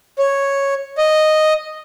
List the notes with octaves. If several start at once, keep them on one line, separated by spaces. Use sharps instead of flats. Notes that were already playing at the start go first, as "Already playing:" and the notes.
C#5
D#5